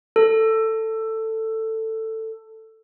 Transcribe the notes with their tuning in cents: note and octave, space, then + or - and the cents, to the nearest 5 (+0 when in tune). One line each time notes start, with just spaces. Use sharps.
A4 +15